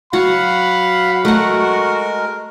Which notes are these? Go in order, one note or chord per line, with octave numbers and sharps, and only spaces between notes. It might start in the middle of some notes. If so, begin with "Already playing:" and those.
F#3 F#4 F5 F#5 B5
G#3 A3 F#4 A#4 F#5